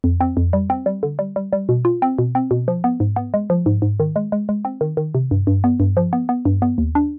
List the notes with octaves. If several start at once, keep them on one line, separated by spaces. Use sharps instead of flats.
F2
C4
F2
G3
C4
G3
D3
G3
G3
G3
B2
F4
C4
B2
C4
B2
F3
B3
G#2
B3
G#3
F3
G#2
G#2
D#3
G#3
G#3
G#3
C4
D#3
D#3
C3
G2
G2
B3
G2
F3
B3
B3
G2
B3
D#2
D4